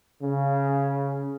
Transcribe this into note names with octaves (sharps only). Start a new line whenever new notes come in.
C#3